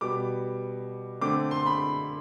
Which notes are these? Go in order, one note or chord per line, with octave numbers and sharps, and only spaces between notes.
B2 G3 B3 D6
D3 A3 C4 D6
C6
B5